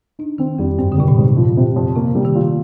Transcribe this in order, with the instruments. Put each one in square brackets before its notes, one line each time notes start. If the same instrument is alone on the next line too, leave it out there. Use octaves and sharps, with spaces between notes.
[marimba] D4 [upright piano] D#4
[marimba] D#3 [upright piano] C4
[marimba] F2 [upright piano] G3
[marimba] G2 [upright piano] C4
[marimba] D3
[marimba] C3 [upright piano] G3
[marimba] A#2
[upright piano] G#2
F3
C3
F2
[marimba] C3 [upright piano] A#3
[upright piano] G3
[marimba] D#3
[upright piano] A#2